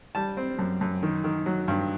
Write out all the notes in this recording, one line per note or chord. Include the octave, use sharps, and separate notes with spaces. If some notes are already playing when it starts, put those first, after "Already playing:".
G3 A5
C4
F#2
F#2
D#3
D#3
F#3
G2